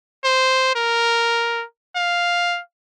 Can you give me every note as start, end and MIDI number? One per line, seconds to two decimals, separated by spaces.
0.24 0.71 72
0.76 1.64 70
1.96 2.60 77